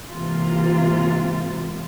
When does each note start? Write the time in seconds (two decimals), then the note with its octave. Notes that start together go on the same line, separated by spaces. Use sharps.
0.11 G#2 C3 E3 A#3 F4